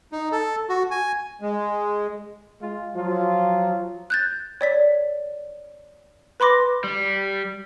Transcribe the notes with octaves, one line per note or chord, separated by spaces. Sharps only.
D#4
A4
F#4
G#5
G#3
G#3 F4
F3 F#3 F4
F#6 G6 A6
C#5 D5 B6
B4 B5 C6 D6 A#6
G3